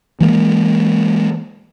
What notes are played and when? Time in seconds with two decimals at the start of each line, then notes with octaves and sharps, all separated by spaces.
0.21 E3 G#3 A#3